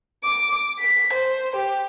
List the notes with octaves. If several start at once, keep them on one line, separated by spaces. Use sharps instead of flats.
D6
B6
C5
G4